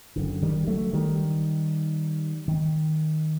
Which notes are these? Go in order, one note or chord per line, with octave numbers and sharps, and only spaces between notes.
F#1 F#2 D3
D#3 G3
F#3 A3
D#3 G3
D#3